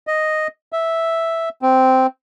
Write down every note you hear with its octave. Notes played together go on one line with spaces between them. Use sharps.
D#5
E5
C4